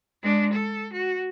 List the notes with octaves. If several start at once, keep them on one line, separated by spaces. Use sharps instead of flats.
G#3 D4
A4
F#4